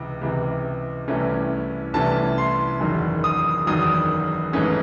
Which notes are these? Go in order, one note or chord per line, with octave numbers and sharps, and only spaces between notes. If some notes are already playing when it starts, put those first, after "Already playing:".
Already playing: C#2 C3 E3
C#2 C3 E3
C2 C3 E3 A3 C#4
C2 C3 E3 A3 C#4 A5
C6
F#1 E2 D#3 F#3
D#6
F#1 E2 D#3 F#3 D#6
G#1 G#2 E3 A3 C#4